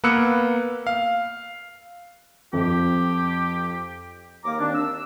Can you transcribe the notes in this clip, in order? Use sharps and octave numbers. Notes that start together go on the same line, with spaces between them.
A#3 B3 B4 E6 F#6 C#7
F5
F2 G4
D#2 A#3 A#4 A#5 D6
D#2 D#3 C4 D4
E6